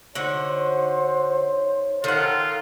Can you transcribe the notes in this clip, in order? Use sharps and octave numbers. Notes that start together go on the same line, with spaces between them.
D3 D#4 F#4 C5 C#5
D#3 F4 A4 F#5